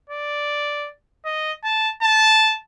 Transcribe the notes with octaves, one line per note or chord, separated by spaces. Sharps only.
D5
D#5
A5
A5